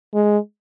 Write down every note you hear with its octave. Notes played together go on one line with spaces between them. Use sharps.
G#3